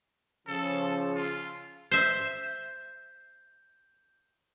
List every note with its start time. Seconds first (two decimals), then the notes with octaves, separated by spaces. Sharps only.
0.47 C#3 F3 A4
1.15 F4
1.91 C5 E5 G6